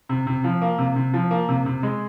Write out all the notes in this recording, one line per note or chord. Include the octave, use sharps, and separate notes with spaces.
C3
C3
F3
A#3
C3
C3
F3
A#3
C3
C3
G#3